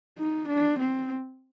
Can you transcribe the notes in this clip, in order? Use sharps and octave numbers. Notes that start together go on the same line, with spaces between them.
D#4
D4
C4